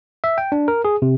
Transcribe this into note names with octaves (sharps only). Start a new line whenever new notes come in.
E5
G5
D4
A#4
G#4
C3